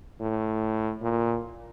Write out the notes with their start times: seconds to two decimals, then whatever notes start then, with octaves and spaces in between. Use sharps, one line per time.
0.21 A2
1.02 A#2